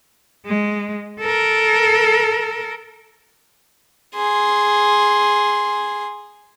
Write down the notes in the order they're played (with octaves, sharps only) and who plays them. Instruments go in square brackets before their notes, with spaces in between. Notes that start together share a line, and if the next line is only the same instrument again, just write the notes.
[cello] G#3
A4 A#4
[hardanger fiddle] G#4 C6